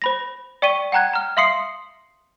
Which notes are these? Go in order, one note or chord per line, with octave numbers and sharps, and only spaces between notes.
C5 B5 A#6
D5 G5 C#6 B6 D#7 G7
F#5 G5 A#5 F#6 G#6
A#5 F6
E5 F5 C6 D#6 C7 C#7